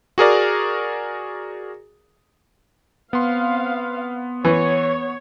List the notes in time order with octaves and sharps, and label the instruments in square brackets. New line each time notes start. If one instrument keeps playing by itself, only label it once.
[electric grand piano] F#4 G#4 A#4 D5
[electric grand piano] B3 C6 [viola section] C4 F5
[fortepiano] E3 [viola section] C#5